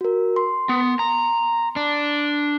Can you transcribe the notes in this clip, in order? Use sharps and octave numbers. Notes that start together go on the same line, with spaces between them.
F#4 A#4
C6
B3
A#5
D4